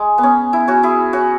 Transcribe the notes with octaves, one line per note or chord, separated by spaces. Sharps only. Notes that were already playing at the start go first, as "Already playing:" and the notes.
Already playing: G#3
B3
C#4
E4
C#4 F#4
E4 G#4
C#4 F#4